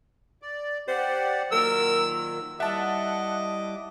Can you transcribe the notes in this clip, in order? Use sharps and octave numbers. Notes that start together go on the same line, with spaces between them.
D5
G4 C5 D5 F#5
A#2 D#3 F#3 A#4 E6
G3 E4 D#5 E5 F#5 A5 D6